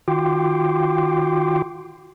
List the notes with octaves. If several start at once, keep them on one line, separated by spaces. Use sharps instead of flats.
D#3 F4 F#4 G5 C6 D6